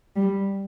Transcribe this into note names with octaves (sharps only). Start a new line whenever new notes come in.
G3